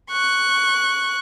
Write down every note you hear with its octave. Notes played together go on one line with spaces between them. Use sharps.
C#6 F#6